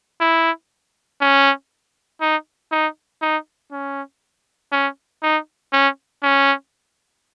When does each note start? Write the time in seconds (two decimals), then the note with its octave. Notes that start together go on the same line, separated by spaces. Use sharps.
0.21 E4
1.21 C#4
2.21 D#4
2.72 D#4
3.22 D#4
3.72 C#4
4.72 C#4
5.23 D#4
5.73 C#4
6.23 C#4